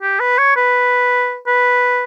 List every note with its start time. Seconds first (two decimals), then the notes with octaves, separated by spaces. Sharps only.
0.02 G4
0.20 B4
0.38 C#5
0.56 B4
1.47 B4